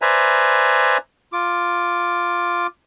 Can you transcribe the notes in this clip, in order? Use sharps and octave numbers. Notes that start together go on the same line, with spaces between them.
B4 C5 D5 E5 G#5 A#5
F4 D6